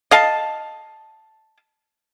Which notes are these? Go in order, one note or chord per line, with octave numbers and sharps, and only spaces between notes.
D#5 F5 A5